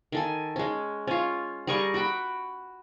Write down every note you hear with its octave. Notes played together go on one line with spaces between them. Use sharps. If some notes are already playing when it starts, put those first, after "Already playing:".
D#3 A4 G#5
G#3 C#4
C#4 F4
G3 G#4 A#4 C#6
F#4 F#5 G5 B5